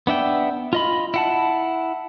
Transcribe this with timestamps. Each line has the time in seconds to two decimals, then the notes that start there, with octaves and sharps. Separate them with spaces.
0.07 B3 D4 E5 G5
0.73 F4 D#5 B5
1.14 E4 F#5 A5